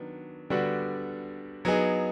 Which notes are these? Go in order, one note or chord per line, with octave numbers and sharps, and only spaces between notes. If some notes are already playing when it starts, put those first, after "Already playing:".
Already playing: D#3 F#3 B3 D4
D3 G3 B3 D4 F#4
F#3 B3 D#4 G#4